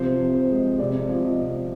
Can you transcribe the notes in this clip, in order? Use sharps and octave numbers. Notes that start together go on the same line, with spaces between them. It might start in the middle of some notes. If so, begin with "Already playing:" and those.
Already playing: C3 F3 C5
C3
C5
G#3
C3 D5
F3
D#5
C3